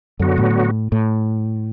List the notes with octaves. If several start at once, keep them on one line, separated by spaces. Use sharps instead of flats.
F#2 D3 F#3 B3 F#4
A2
A2